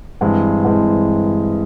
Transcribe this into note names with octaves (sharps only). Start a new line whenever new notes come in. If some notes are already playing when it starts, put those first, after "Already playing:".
G2 E3 G#3 C4
G2 E3 G#3 C4